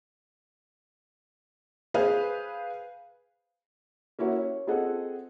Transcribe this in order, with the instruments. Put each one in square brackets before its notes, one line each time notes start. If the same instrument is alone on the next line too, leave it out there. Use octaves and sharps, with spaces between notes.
[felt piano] G#4 B4 C5 F5
A#3 C#4 E4 F#4
C#5
C4 F4 G#4 A4 D#5 F#5